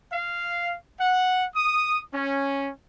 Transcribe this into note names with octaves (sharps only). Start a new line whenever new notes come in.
F5
F#5
D#6
C#4